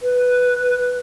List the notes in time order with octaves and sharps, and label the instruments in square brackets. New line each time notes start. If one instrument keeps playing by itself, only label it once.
[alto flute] B4